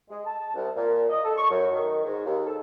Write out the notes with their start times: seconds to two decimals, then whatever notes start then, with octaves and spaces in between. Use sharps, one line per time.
0.09 G#3
0.25 A5
0.54 C2
0.76 A#2
1.10 D#5
1.24 A4
1.37 C#6
1.50 F#2
1.72 D#3
2.04 G#2
2.25 D#2
2.46 A4